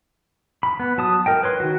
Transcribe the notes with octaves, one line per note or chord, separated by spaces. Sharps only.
B5
B3
F#3 A5 D#6
A#4 D#5 G5
B4 C#5 C6
D#3 F#4